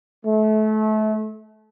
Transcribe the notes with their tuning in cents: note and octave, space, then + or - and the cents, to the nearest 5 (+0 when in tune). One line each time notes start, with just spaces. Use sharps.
A3 -30